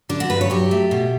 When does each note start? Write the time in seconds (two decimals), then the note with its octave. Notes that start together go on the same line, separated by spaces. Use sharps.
0.09 D3 D4
0.20 F#4
0.30 G2 B4
0.41 C#5
0.50 F#3 G4
0.71 A3
0.91 B2